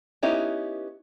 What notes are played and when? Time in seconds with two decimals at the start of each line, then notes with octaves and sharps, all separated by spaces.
0.23 B3 C#4 D#4 E4 G4